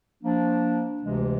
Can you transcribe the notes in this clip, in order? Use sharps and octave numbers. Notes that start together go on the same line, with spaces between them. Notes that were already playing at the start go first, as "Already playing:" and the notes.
F3 A#3 D4
D2 C3 E3 G#3